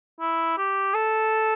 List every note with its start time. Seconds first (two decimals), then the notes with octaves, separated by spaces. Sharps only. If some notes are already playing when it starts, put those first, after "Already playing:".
0.20 E4
0.58 G4
0.94 A4